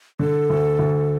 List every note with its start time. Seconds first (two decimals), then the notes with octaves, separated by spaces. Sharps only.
0.19 D3 A4
0.50 D2
0.79 D2